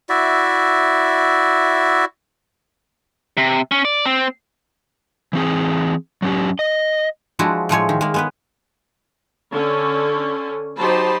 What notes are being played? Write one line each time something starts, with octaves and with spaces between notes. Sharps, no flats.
E4 F#4 D5 E5
C3
C#4
D5
C4
E3 C4 G#4
F#3 C#4 G4
D#5
F3 G#3 D4 E4 F#4
A2 F3 G#3 C#5
D#3
G#3 A#3
G#3 B3 B4
D3 C#4
F#3 D#4 G4 C5 A5 B5